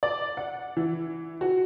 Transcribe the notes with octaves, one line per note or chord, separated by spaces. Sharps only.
D5
F#5
E3
F#4